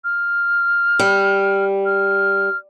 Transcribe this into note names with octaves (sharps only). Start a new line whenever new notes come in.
F6
G3
F6